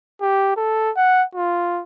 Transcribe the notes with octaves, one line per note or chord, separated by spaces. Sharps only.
G4
A4
F#5
F4